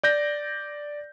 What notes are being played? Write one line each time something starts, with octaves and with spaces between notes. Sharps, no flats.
D5 G6 A#6